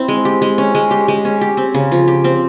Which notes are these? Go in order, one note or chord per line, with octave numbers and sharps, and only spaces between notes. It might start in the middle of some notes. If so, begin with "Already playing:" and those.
Already playing: C4 E4
G#3
G4
G#3
C#4
G#3
G4
G#3
C#4
G4
C4
C#3
F3
G4
C4